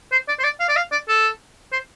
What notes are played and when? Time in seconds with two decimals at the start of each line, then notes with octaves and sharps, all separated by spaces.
0.12 C5
0.28 D5
0.39 C5
0.44 D5
0.60 F5
0.69 D5
0.77 F5
0.92 D5
1.09 A4
1.72 C5